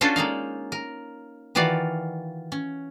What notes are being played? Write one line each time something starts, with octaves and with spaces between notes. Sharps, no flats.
C#4 D4 F4 F#4 A4 C5
G#3 A#3 D#4 F5
A#4
D#3 E3 F4 F#4 D5 F5
C#4